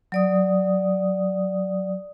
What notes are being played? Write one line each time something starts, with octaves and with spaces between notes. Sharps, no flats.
F#3 D5 D#6